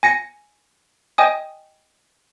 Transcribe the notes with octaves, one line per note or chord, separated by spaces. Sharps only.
G#5 A#6 C#7
D#5 G5 G#5 D#6